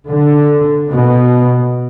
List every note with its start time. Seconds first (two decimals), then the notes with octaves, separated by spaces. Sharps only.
0.10 D3
0.89 B2